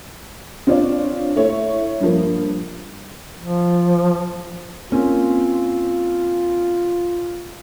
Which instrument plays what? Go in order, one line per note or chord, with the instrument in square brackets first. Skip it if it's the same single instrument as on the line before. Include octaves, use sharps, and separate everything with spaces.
[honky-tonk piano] C4 D4 F4 C#5 D5
A3 E4 C#5
G2 F3 A#3
[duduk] F3
[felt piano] A#3 C4 C#4 [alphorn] F4